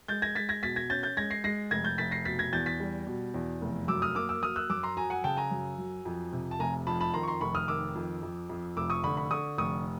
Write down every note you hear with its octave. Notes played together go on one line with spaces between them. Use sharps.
G#3 G6 A6
G#6 A#6
G#3 A6 B6
G#6 A#6
B2 A6 B6
G#6 A#6
C#4 G6 A6
G6 A6
G#3 G#6 A#6
A#6 C7
G#3 A#6 C7
F1 G#6 A#6
G6 A6
F1 A6 B6
A#6 C7
B2 A6 B6
G#6 A#6
E2 G6 A6
A6 B6
G3
B2
E2
F1
F#2 D6 E6
D#6 F6
A#3 D6 E6
D6 E6
F#3 D#6 F6
E6 F#6
F#2 D6 E6
A#5 C6
F#3 G#5 A#5
F#5 G#5
C#3 G5 A5
G#5 A#5
F#2
F#3
F2
C3
A5
F1 G#5 A#5
F2 A5 B5
A5 B5
D#3 A#5 C6
C#6
A#5 C6
F1 B5 C#6
D#6 F6
D#3 D6 E6
F2
F2
F2
F1 D6 E6
C#6 D#6
D3 B5 C#6
B5 C#6
D3 C#6 D#6
F1 C#6 D#6